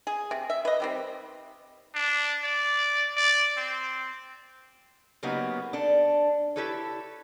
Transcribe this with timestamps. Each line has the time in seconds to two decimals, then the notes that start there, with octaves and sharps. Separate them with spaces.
0.07 G#4
0.31 C3
0.50 E5
0.65 B4 D#5
0.80 D#3 G3 C4
1.95 D4
2.44 D5
3.17 D5
3.57 C4
5.23 C#3 F#3 A#3 B3 D#4 G4
5.73 D4 A4
6.56 E4 G4 A4 B4 C#5